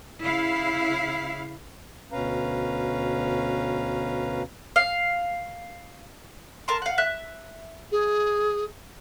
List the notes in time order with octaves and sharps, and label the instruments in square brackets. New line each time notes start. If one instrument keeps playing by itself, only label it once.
[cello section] C#3 E4 F5
[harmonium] D2 B2 C#4 B4 F5 A#5
[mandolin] F5
A#4 A5 C6
F5 F#5
E5 F#6
[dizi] G#4